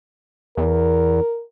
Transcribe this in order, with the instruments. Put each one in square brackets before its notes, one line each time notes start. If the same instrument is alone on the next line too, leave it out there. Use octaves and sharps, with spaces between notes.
[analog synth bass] E2 [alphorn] A#4